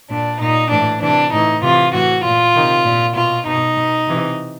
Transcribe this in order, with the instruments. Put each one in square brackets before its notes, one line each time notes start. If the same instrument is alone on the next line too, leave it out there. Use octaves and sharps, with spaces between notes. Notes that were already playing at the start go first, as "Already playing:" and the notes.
[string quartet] A#2 D4
A#2 D#4
A2 E3 D4
C3 E3 D4
A2 E3 D#4
C3 E3 F4
A2 E3 F#4
A#2 F4
C3 D#3
A#2
B2 F4
B2 D#4
B2
C3 E3